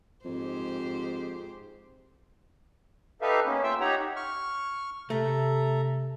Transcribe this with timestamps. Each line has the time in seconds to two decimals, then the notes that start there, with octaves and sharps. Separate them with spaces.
0.25 F2 G#2 G4 C5
3.22 D#4 G4 A4 B4 E5 F5
3.46 A#3 B3 C#4
3.63 F4 E5 G5 E6
3.81 D#4 G4 C#5 F#5 A#5
4.16 C#6 F6
5.10 C3 A3 A4 E5 A#5